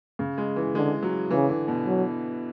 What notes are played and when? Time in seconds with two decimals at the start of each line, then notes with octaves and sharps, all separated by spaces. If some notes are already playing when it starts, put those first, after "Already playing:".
0.19 C#3
0.38 G#3
0.56 E3
0.75 D3 G#3
1.03 F#3
1.31 C#3 E3
1.49 D3
1.68 B2
1.86 F#3